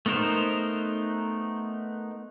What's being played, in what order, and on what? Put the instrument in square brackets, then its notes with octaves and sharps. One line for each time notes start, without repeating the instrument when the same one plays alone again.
[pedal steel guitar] A3 B3 D#4 A#4 C5